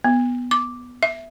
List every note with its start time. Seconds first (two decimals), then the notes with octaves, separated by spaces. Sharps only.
0.04 B3
0.51 D6
1.03 E5